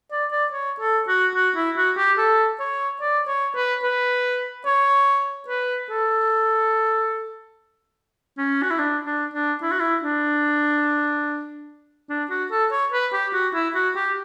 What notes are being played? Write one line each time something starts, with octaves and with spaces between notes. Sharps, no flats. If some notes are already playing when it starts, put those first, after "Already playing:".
D5
D5
C#5
A4
F#4
F#4
E4
F#4
G4
A4
C#5
D5
C#5
B4
B4
C#5
B4
A4
C#4
F#4
E4
D4
D4
D4
E4
F#4
E4
D4
D4
F#4
A4
C#5
B4
G4
F#4
E4
F#4
G4